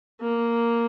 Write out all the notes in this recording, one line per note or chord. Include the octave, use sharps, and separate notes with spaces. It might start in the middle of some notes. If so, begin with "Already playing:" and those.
A#3